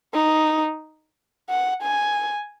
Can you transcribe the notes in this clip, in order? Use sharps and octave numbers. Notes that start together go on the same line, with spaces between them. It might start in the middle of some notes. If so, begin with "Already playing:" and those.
D#4
F#5
G#5